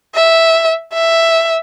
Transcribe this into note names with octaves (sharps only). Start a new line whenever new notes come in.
E5
E5